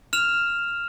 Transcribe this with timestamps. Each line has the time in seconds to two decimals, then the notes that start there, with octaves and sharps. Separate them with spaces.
0.13 F6 E7 F7